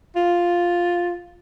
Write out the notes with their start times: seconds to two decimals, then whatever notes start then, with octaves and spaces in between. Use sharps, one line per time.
0.16 F4